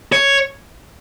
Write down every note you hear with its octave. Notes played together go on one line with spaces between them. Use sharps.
C#5